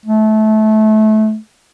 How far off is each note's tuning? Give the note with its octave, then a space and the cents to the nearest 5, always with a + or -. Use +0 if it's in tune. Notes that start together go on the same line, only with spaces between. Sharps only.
A3 -25